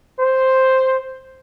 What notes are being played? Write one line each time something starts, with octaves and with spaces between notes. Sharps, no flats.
C5